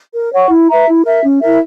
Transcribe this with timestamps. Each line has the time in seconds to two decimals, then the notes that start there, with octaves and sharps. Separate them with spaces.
0.14 A#4
0.32 C#5 F#5 C#6
0.50 E4
0.69 B4 E5 A#5
0.87 E4
1.04 A#4 E5
1.23 C#4
1.41 E4 A#4 E5